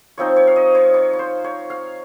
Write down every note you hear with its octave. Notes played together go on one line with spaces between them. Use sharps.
F3 C4 D#4 C#5
C#5
F5
D#5
C#5
C#5
C#5
C5
C#5
F5